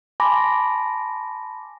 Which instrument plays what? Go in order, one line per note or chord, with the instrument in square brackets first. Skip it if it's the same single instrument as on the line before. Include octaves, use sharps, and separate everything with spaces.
[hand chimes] G#5 A5 B5 C6 D6 A#6